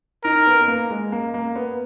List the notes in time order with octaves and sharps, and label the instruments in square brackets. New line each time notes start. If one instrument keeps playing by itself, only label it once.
[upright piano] D#4 [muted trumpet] A#4
[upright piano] B3
B3
A#3
G#3
A#3
A#3
B3